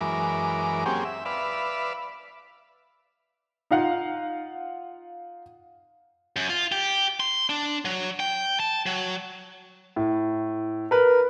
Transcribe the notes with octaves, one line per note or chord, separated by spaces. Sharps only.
F#2 E3 G#3 A#4 D6
F#3 A#3 C4 C#4 G4 G#4
E5
B4 D5 E5 F5
D#4 F4 F5 F#5
F#2
F4
G4
C6
D4
F#3
G5
A5
F#3
A2
A#4 B4